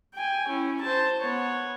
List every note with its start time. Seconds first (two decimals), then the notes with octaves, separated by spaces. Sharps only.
0.14 G5 G#5
0.48 C#4 E4
0.81 C5 A5
1.21 B3 C#5